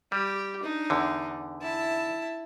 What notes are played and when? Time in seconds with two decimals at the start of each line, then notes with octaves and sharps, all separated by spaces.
0.12 G3 G4
0.59 D4 D#4
0.90 E2 D3
1.62 E4 A5